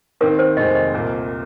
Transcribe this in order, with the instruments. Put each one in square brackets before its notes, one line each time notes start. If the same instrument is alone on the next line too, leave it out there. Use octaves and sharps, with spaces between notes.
[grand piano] D#2 D#3 C4 D#4 [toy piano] A#4
[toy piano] C5
[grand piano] F1 D#2 D#3 G#3 C4 [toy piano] D#5
[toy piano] D#5
[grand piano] C2 A#2 A#3